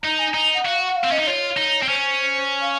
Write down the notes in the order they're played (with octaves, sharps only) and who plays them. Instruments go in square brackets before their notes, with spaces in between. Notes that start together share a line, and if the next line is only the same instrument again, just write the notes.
[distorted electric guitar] D#4 [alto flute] A#5
[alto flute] G#5
[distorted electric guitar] D#4 [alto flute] A#5
[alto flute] F#5
[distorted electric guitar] F#4 [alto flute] F5
[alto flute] F#5
F5
[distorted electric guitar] C4
[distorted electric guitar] C#4 [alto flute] D#5
[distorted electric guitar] D#4
[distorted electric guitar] F4 [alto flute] C#5
[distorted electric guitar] D#4
C4
[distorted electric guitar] C#4 [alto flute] C5
[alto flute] F5